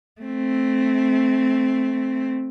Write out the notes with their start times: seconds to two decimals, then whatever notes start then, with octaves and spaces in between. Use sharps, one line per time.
0.21 A3 C4